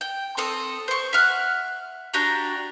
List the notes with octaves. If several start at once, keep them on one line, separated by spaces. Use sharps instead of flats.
G5
C4 A4 D#6
C5 C#6
E5 F#5 F6 F#6
D4 F#4 G4 A#5